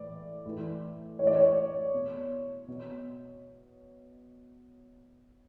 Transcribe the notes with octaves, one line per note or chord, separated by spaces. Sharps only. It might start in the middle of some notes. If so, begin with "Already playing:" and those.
Already playing: A2 E3 D5
A2 E3
A2 E3 C#5 D5
C#5
B2
B2